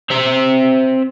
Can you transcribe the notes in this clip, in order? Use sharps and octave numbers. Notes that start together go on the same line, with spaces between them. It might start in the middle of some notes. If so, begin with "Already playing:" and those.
C4 E5